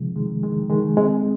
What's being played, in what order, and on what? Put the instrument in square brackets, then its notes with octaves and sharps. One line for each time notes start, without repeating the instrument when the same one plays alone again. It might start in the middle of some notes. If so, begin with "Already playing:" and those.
Already playing: [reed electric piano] C3 D#3 F3 G#3
D#3 G#3
D#3 G#3
D#3 G#3
G#3 C4